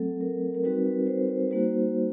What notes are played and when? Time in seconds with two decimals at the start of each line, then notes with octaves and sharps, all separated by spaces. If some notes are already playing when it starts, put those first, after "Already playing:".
Already playing: F#3 A3 C4 A4
0.21 A#4
0.54 A#4
0.64 G3 C4 D#4 F#4 B4
0.87 B4
1.07 C5
1.29 C5
1.51 G3 A#3 D#4 F#4 C5